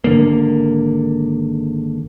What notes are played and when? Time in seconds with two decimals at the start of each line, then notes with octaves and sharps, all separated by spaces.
0.04 G#1 D3 A#3